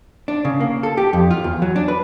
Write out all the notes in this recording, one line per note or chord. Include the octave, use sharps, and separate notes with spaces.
D4
C#3
A#3
A4
G4
F2
F4
E2
F#3
D4
B4